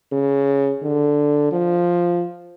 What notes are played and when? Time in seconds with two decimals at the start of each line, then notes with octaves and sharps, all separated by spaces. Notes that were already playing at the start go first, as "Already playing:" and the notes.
0.12 C#3
0.83 D3
1.52 F3